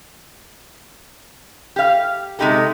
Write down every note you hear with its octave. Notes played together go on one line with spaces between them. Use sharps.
G4 F5
C3 G#3 D#4 G4 A4